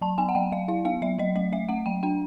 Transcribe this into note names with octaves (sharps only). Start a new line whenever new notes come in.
F#3 A5
B3 G#5
F#5
F#3 G5
F#3 F5
E4 F5
B3 F5
F#3 E5
F#3 D#5
A3 D#5
A3 E5
A3 F#5
F#3 G5
D4 G5